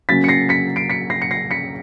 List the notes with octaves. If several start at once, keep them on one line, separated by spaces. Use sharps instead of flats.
C#3 F#3 A#3 C#4 A6 B6
C#7
A#6 C7
B6 C#7
C7 D7
B6 C#7
A#6 C7
C#7
A#6 C7
B6 C#7